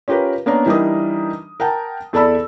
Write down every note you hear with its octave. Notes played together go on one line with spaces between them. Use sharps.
C#4 F4 G4 A#4 B4
A#3 B3 C#4 D4 A#4
E3 G3 D4 D#4 A#4 D#6
A#4 F#5 G5 A5
E2 A4 D5 A5 B5 E6